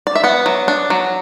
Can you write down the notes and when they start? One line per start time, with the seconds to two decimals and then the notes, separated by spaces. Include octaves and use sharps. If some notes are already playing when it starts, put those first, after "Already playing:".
0.07 D5
0.15 E5
0.24 B3 F#5
0.46 F#3
0.68 D4
0.90 F#3